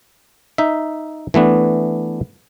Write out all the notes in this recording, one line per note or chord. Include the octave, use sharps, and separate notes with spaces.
D#4 E5
E3 A3 B3 D4